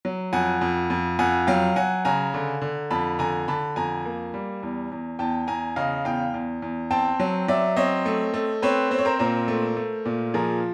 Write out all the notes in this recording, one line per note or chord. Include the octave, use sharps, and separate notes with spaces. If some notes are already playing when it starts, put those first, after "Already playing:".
F#3
F2 F#5 G#5
F2
F2
F2 F#5 G#5
F#3 F5 G5
F#3 F#5 G#5
C#3 G#5 A#5
D3
D3
F2 A5 B5
D3 G#5 A#5
D3 A5 B5
F2 G#5 A#5
A#3
G3
E2
E2
E2 G5 A5
E2 G#5 A#5
C#3 D#5 F5
E2 F5 G5
E2
E2
C4 G5 A5
F#3
F#3 D5 E5
C4 C#5 D#5
A3
A3
C4 B4 C#5
C4 C5
C#5
A#4 C5
A#2 A#4 C5
A3
A3
A#2
F3 G#4 A#4